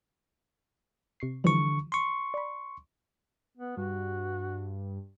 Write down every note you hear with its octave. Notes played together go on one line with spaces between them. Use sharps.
C3 C#6 C7
D3 E3 F3 G3 C#6
C6 C#6
D5 B5
B3
G2 F#4